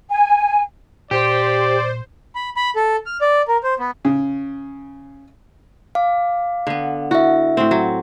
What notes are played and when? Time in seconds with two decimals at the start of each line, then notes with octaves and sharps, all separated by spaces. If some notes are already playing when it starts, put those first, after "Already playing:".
0.10 G#5
1.11 A#2 G4 C5 D5
2.35 B5
2.57 B5
2.76 A4
3.06 F6
3.21 D5
3.48 A#4
3.63 C5
3.79 B3
4.05 C#3
5.95 F5 D6
6.67 D3 B3
7.11 E4 F#4 E5
7.57 A2 C4
7.71 F#3